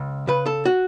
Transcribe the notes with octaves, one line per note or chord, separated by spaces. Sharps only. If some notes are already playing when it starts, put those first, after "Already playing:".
Already playing: C#2
C#3 B4
A4
F#4